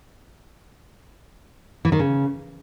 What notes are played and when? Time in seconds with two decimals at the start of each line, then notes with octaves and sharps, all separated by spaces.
1.85 E3
1.92 D#3
1.99 C#3